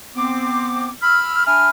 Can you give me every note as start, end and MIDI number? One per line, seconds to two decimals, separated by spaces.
0.15 0.89 59
0.15 0.89 60
0.15 0.89 86
1.03 1.44 83
1.03 1.44 88
1.03 1.44 89
1.46 1.70 62
1.46 1.70 76
1.46 1.70 80
1.46 1.70 83
1.46 1.70 89